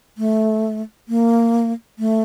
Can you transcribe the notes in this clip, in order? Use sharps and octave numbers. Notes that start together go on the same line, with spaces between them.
A3
A#3
A3